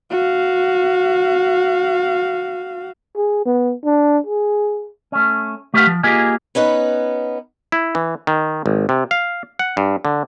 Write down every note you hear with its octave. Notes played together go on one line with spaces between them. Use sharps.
F#4 F5
G#4
B3
D4
G#4
A3 C#4
A3 G4 B4 C5 F5 F#5
F3
A#3 F4 G4 G#4 A#4 D#5
B3 C#4 D#4 B4
E4
E3
D#3
G#1
C3
F5
F#5
G2
D3